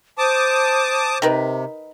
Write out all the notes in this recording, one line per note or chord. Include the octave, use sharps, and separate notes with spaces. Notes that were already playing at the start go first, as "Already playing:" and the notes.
C5 A5 D6 D#6
C3 D#3 A#4 B4